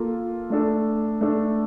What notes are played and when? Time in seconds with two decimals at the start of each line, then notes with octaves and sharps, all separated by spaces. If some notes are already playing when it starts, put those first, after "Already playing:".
Already playing: A#3 F4 A4
0.50 A3 D4 A4
1.21 A3 D4 A4